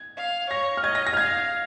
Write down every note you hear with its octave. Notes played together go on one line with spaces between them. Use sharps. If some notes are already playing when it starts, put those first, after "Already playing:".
Already playing: G#6
F5
C#5 A#6
F6
D#5 G#6
A#6
A#6
F6
F5 G#6